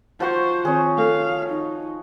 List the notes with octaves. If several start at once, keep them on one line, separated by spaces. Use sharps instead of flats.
F3 F#4 C5 A5 C#6
D#3 C4 G#4 C#5
A3 A4 F5
D#4